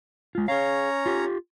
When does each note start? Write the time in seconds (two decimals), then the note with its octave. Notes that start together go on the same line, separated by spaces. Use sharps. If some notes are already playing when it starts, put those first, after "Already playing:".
0.35 G#3 F4
0.48 C#4 G#4 C#5 F5 A#5
1.06 F4 G4